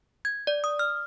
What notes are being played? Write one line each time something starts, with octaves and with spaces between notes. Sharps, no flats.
G#6
D5
D#6
F6